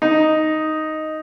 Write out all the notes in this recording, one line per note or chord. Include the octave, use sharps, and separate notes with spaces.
D#4